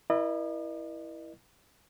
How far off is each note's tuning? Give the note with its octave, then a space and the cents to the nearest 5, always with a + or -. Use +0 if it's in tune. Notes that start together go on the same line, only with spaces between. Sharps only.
E4 +0 A#4 +45 D#5 -45